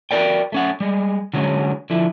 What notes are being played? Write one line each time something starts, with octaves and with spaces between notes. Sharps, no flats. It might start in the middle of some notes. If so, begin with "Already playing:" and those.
F#4 G4 A#4 D5 G5
A3 C#4 F#5
G3 G#3
D3 F#3 G#3 C#4
D3 F3 E4